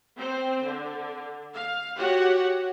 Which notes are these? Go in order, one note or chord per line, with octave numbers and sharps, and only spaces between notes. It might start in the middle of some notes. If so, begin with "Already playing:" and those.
C4 C5
D3
F5
F#4 G4 C#5 F#5